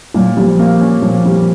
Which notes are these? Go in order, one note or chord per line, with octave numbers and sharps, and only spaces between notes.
A#2 F#3
F3 G3
A#3
C#4
A#2 F3
G3